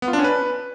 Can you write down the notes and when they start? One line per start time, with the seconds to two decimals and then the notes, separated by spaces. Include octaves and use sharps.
0.02 B3
0.08 F4
0.13 D4
0.19 C#4
0.24 B4